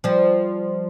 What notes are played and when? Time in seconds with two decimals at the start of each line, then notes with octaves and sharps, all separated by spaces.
0.04 F3 G3